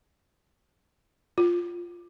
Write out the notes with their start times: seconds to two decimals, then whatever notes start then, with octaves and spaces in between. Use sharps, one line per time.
1.38 F4